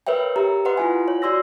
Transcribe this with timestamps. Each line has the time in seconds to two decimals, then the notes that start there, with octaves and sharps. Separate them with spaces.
0.07 A#4 B4 C#5 E5 G5
0.36 G4 E5 A#5
0.65 B4 D#5 F#5 C6
0.77 E4 F4 G#5
1.08 C#5
1.22 F#4 D5 C6 E6 A#6